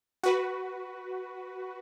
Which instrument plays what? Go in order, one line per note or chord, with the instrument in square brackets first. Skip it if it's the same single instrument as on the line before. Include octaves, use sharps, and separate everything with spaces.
[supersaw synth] F#4 B4